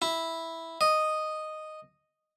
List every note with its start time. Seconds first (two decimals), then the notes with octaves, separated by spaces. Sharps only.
0.02 E4
0.81 D#5